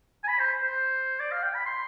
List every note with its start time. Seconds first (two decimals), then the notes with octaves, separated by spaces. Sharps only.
0.24 G#5
0.28 B5
0.39 C5
0.63 C5
1.20 D5
1.31 F5
1.43 G5
1.54 B5
1.66 C6